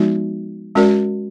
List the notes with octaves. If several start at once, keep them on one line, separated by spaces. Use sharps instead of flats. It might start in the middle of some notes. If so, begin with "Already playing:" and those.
Already playing: F3 G#3 B3 D#4 F#4
G#3 C#4 F#4 A#4 D5